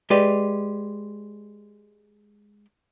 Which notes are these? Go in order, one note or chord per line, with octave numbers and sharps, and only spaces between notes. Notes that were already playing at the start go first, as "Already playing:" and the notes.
G#3 G4 B4 D5